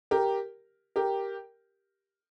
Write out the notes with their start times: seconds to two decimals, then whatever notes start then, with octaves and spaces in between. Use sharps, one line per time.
0.11 G4 A#4
0.96 G4 A#4